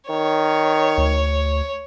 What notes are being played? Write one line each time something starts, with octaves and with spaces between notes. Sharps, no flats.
D#3 C#5
D2